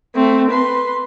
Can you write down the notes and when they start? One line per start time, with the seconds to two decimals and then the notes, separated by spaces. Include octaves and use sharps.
0.15 A3 C4
0.51 B4 C6